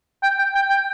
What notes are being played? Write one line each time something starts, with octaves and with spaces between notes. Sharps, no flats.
G5
G5
G5
G5